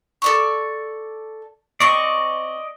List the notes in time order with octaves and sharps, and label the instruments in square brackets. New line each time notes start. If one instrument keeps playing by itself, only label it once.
[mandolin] A4 D5 C#6
[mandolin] C4 C#6 [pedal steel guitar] D5 D#5